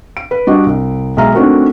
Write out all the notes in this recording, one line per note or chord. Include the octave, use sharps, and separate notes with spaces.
D7
B4
G3 D4 F#4 D#5
C2
B1 G#3 G#4 E5 A#5 F6
A3 C4 D4 D#4 F#4 A#4